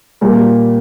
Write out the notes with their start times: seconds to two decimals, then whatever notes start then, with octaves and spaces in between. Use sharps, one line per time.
0.21 A#2 G3 A#3